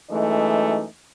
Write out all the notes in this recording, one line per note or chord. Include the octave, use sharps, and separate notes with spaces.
F#2 E3 G#3 A3 D#4 D#5